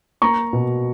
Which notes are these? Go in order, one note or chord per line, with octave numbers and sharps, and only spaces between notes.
A#3 A#5 C#6
B2